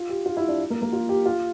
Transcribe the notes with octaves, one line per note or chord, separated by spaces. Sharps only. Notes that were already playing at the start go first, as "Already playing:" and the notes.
Already playing: F4
G4
F4
E4
D4
A#3
A#3
F4
G4
F4